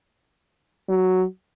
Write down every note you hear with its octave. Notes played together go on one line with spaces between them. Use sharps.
F#3